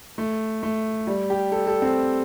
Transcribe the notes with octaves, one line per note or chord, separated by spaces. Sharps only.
A3
A3
G3
G4
A4
A4
C4